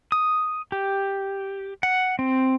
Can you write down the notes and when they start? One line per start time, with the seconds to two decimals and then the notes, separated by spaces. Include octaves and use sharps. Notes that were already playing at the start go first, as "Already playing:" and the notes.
0.12 D#6
0.72 G4
1.83 F#5
2.19 C4